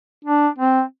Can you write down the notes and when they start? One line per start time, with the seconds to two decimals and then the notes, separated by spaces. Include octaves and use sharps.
0.25 D4
0.58 C4